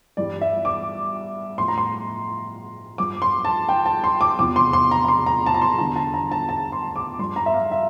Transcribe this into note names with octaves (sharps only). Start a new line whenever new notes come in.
G2 E3 G3 D5
E5
D6
A2 F3 C6
A#5
C6
G2 F3 D6
C6
A5
G5
A5
C6
D6
E2 C3 F3 D6
C6
C6
A#5
A#5
C6
A#5
A5
A#5
C6
E2 D3 G3 A#5
A5
A#5
A5
A5
C6
D6
G2 F3 C6
A#5
E5
F5
E5